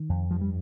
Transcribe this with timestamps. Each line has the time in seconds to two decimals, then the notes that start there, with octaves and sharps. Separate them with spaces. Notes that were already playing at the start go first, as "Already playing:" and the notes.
Already playing: D#3
0.09 F2
0.31 G2 F3
0.41 G3